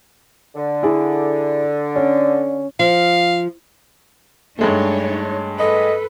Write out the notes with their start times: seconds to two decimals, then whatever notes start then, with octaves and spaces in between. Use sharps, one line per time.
0.55 D3
0.83 E4 G#4 D5
1.96 C#4
2.79 F3 F5
4.59 G2 G#3 A3 D4 D#4 C#5
5.59 A4 B4 D#5